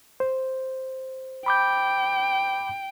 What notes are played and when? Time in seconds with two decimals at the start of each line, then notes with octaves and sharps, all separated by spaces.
0.20 C5
1.46 G5 B5 D6 G6